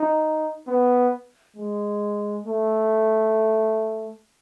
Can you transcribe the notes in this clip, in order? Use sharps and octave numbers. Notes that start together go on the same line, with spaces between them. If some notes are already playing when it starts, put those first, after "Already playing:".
Already playing: D#4
B3
G#3
A3